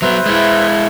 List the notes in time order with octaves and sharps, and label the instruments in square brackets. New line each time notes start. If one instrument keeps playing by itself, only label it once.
[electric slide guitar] F#3 B3 [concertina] B4 C5 E5
[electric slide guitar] G#3 E4